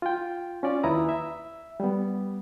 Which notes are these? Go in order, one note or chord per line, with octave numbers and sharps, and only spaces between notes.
F4 G5
C#4 F4 D5
D#2 E4 B4 A#5 D#6
E5
G3 B3